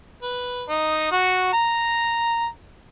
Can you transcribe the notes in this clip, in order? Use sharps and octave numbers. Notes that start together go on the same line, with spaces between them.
B4
D#4
F#4
A#5